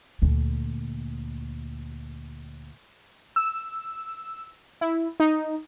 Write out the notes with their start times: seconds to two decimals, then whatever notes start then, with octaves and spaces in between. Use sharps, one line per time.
0.22 D2 A#2
3.36 E6
4.81 E4
5.20 D#4